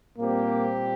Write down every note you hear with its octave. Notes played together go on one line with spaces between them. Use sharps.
A#2 G3 A#3 C4 G4